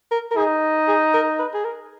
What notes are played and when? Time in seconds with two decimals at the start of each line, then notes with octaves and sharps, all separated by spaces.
0.11 A#4
0.31 A#4
0.37 D#4 G#4
0.88 G#4
1.14 A#4
1.39 B4
1.54 G#4
1.64 A#4